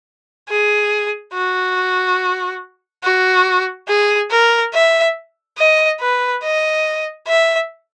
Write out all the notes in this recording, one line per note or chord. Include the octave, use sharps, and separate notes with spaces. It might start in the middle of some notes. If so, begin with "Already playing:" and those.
G#4
F#4
F#4
G#4
A#4
E5
D#5
B4
D#5
E5